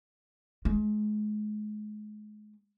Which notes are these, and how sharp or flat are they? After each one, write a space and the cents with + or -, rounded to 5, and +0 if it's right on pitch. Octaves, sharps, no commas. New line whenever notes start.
G#3 +35